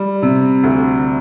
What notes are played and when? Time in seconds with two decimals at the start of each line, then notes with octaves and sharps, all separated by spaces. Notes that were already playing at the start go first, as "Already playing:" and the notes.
Already playing: G3
0.22 C3
0.63 D2